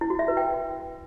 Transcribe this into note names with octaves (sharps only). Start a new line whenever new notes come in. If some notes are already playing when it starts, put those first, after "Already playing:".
E4
F#4
E5
B4
G5